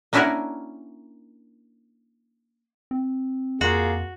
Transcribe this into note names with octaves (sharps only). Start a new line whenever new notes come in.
A#3 C#4 D4 E4 F#4 A#4
C4
F2 A#3 F4 F#4 G#4